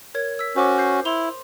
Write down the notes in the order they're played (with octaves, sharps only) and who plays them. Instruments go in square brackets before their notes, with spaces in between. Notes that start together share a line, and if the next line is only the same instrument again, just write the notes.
[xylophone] A#4 C#5 G#6
E6 B6
[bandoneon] C#4 F#4 [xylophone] C5 D6
[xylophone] G6 C7
[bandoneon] E4 [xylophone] C6 F7 G7